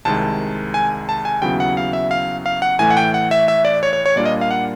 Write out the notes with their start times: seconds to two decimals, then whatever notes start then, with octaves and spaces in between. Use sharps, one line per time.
0.05 C2 C3 D#3 G#3 A5
0.74 G#5
1.09 A5
1.25 G#5
1.42 D#2 C#3 F#3 B3 E4 G5
1.60 F#5
1.77 F5
1.93 E5
2.11 F5
2.46 F5
2.62 F#5
2.79 A2 E3 A3 G#5
2.90 F#5
2.97 G5
3.14 F#5
3.31 E5
3.48 E5
3.65 D5
3.83 C#5
3.93 C#5
4.06 C#5
4.16 A#2 G3 A#3 D4 F4 D5
4.26 D#5
4.41 F5
4.51 F#5